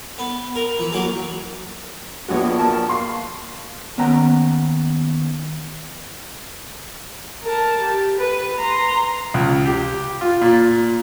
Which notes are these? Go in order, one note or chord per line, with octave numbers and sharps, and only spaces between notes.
B3
A#4
E3
F#3 A#3 G#4
A#1 B3 D4 F#4 C#5
A#4 A5
A#3 C6 C7
D#2 B3 C#4 G5 A#5
A#4 A5
G4
B4
A#5 C6
C#2
G4
F4
A#2